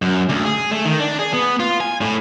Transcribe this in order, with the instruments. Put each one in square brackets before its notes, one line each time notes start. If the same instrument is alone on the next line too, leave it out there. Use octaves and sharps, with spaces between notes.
[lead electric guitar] F#2
D2
G#4
A3
D#3
D4
G#4
B3
F4
G#5
A2